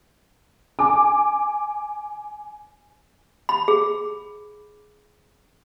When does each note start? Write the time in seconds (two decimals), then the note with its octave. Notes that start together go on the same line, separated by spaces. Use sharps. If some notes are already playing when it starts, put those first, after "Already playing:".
0.79 G#5 D6
3.49 B5
3.68 G#4